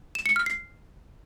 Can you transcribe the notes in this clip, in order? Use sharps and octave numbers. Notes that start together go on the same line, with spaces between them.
E7
C#7
F6
C7